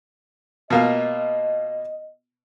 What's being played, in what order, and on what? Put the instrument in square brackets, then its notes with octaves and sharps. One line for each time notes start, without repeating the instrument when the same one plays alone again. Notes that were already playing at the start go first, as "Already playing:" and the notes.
[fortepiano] B2 A#3 F4 [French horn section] D#5